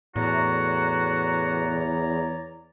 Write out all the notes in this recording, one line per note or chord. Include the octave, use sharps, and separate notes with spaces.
E2 A2 F#4 C#5 D5 A#5